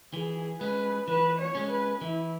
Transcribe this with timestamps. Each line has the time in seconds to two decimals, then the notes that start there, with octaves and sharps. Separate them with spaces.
0.13 E3 G#4
0.60 G#3 C#4 B4
1.08 E3 B4
1.39 C#5
1.55 G#3 C#4
1.70 B4
2.01 E3 E4